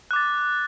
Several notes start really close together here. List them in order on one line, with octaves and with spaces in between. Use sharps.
F#6 D6 A6